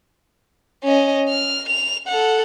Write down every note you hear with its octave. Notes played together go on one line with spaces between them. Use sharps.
C#4 D#5
F6
F7
A4 F#5